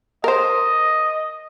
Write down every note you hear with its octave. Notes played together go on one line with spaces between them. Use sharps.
A#4 C5 D#5